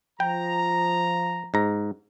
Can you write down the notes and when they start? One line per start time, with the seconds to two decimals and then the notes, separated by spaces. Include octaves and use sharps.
0.20 F3 G5 A#5
1.54 G#2 A#5